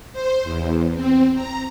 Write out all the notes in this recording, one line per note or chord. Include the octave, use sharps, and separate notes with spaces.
C5
E2
C4
A#5